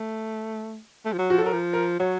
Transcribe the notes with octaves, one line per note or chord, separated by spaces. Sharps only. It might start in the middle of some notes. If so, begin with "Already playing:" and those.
Already playing: A3
A3
F3
F#3
F3 F#4
A4
F#3 A#4
F3
A#4
F#3 C#5